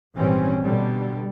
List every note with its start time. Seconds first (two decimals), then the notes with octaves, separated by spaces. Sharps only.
0.16 G#1 A#2 E3 G3 C4 C#4
0.63 B2 D3 G3